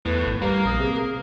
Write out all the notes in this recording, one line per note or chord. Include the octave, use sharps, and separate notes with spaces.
E2 A2 B4
G#1
G3 A#3 A#4
A#1 D#6
C3 G#4